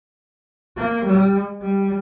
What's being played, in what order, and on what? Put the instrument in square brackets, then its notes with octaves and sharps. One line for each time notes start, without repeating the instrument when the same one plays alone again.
[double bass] A#3
G3
G3